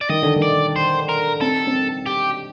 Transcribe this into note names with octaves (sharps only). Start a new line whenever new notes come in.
D5
D#3 D#5
D3
D#3
D5
C5
A#4
C4 A4
C4
G4